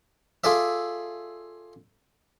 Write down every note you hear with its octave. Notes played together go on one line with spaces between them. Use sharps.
F4 G#4 A4 D5 E5